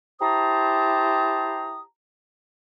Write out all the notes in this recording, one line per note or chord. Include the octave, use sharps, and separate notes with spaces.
E4 G4 C5 A5 A#5 D#6